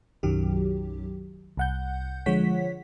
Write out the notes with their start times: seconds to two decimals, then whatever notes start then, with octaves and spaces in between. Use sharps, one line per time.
0.23 B1 F#2 D#3 F#3 G4
1.57 C2 F#5 G6
2.26 D3 F3 G#3 C#5 F#5 B6